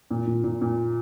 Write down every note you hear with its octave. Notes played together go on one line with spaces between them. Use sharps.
A#2
A#2
A#2
A#2